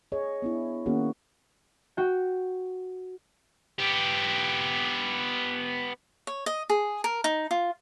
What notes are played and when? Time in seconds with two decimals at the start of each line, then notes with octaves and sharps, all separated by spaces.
0.12 G#4 C#5 D#5
0.42 B3 D4 E4
0.86 D#3 A#3 C#4 F#4 G#4
1.97 F#4 G5
3.79 B3 G4
6.27 C#5
6.46 D#5
6.70 G#4
7.04 A#4
7.24 D#4
7.51 F4